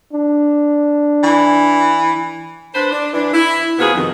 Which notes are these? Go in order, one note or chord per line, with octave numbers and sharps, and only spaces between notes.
D4
E3
D4 B4 C5
D4
E3 D4
E4
C3 A#3 B3 F4 F#4 G#4
F2 B2 D#3